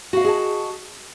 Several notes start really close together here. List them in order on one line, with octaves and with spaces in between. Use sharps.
F#4 F5 D#5 G#4 A5